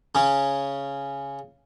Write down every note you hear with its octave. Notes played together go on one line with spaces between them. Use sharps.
C#3 C#4